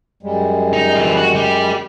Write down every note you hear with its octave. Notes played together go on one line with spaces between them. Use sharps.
F#2 G3 G#3
D#4
E3 F4
F#4
G4 D5